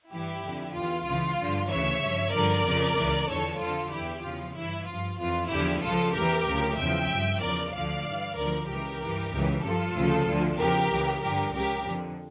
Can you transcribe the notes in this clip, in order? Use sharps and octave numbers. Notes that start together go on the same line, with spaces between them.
G2 E3 E4 G4
F2 D3 F3
E2 E3 F4
C#2 C#3 E3 F4
G2 D3 F3
D2 C#3 E3 C#5 E5
G2 F3
G2 D3 F3 A#4 D5
F2 C#3 F3
C#2 C#3 E3
E2 D3 F3 A4 C#5
F2 D3 F3 F4 A4
E2 E3 E4 G4
E2 C#3 F3 F4
G2 E3 E4
G2 F3 F4
F2 E3 F4
E2 D3 F3 E4 G4
C#2 C#3 F3 F4 A4
E2 E3 G4 A#4
D2 C#3 F3
E2 C#3 F3 E5 G5
G2 F3
E2 C#3 F3 A#4 D5
D2 D3 F3 D5 F5
G2 E3
D2 D3 F3 A#4 D5
C#2 C#3 E3 G4 A#4
G2 E3
C#2 C#3 E3
G2 F3 F4 A4
D2 C#3 F3
D2 D3 F3
E2 C#3 F3 G4 A#4
C#2 C#3 E3
G2 D3 F3 G4 A#4
C#2 C#3 F3 G4 A#4
F2 D3 F3